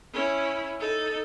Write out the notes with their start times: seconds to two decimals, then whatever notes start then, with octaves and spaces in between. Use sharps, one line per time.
0.13 C#4 E4
0.80 D#4 A4